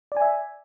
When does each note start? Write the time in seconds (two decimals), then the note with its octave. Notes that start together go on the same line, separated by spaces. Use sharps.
0.12 D5
0.17 G#5
0.21 E5